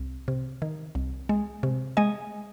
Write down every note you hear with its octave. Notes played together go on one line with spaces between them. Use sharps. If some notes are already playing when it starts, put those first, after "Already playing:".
Already playing: C2
C3
D#3
C2
G#3
C3
G#3 D#5 G#5